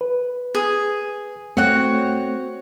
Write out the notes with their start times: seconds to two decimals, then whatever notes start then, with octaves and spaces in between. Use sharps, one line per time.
0.01 B4
0.55 G#4
1.57 A3 C4 F#4 C#5 F#5